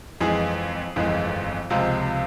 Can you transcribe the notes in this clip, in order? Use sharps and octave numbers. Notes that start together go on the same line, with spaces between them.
F2 E3 G#3 G#4
G1 F2 E3 G#3
C#2 C3 F3 G#3 F5